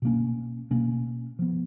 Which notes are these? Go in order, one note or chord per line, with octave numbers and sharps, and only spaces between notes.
B2 A#3 C#4
B2 A#3 C#4
F3 B3